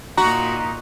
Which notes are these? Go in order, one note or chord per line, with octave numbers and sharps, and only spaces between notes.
A#2 D#4 F#4 A#5